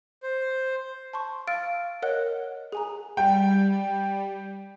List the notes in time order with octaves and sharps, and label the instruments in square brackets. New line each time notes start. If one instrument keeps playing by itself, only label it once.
[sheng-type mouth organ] C5
[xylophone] A5 C6 C#6
F5 E6 F6 A6 D7
A#4 C#5 D#5 F#5 F#6
G#4 G#5 A#5
[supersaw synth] G3 [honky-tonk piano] G5